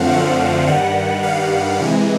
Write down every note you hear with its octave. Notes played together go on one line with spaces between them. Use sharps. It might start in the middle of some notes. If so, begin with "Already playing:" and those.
Already playing: F#2 D3 F3 A3 C4 F5 F#5
F#5
G2 D#3 G3 F#5
F5
C3 E3 G#3